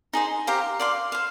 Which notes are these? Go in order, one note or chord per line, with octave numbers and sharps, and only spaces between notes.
D#4 G#4 C5
G4 C5 F5 A#5
D5 F5 C6
C5 F5